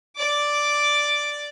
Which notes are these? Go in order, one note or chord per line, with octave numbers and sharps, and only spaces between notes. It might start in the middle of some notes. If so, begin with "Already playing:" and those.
D5 D6